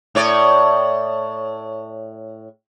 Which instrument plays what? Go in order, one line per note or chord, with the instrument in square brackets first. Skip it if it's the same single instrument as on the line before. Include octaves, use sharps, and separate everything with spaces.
[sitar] A2 C#5 D5